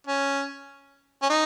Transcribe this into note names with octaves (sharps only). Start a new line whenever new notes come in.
C#4
C#4
D#4